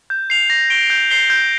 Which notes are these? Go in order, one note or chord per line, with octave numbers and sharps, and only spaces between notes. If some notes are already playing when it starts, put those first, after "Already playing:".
G6
C7 F7
A#6
D7 G7
G6
C7 G7
G6